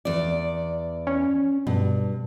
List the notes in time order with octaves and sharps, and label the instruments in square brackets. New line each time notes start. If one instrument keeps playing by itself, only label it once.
[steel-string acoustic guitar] E2 D5
[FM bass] C#4
[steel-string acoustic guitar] G2 [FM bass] B2